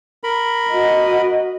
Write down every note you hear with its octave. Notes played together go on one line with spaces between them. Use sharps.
A#4 B5
F#4 D#5